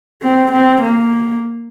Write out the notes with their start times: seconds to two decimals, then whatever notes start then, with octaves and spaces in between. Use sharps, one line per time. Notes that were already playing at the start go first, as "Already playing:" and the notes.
0.22 C4
0.52 C4
0.82 A#3